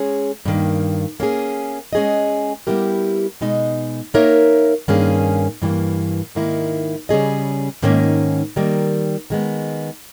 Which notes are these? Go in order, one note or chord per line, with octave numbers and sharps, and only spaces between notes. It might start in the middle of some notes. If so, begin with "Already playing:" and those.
Already playing: G#3 C#4 G#4 C#5
G2 D#3 A#3
A#3 C#4 G#4
G#3 C#4 G#4 D#5
G3 B3 E4 G4 A#4
B2 G#3 D#4
A#3 D#4 A#4 C#5 E5
G2 D#3 A#3 C#4 G#4
G2 E3 G3 A#3
G#2 D#3 A#3 E4
C#3 G3 C#4 G#4 D#5
G#2 D#3 A#3 C#4
D#3 G3 A#3
D#3 G#3 B3